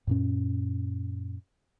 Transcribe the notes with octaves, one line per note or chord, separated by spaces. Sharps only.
F#2 A#2 C#4